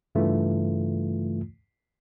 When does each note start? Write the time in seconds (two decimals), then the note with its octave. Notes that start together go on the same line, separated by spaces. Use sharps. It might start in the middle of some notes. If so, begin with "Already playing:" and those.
0.15 G2 C#3 E3 A3 F4